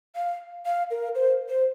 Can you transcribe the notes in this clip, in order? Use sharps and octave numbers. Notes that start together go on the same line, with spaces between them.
F5
F5
A#4
C5
C5